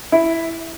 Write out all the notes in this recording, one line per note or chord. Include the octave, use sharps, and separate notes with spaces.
E4